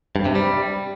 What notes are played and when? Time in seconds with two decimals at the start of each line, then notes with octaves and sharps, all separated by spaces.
0.16 G2
0.25 C3
0.35 G3